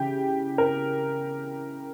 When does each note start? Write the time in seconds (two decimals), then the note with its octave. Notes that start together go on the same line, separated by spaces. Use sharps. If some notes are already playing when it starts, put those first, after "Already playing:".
Already playing: C#3 E3 G4
0.58 A#4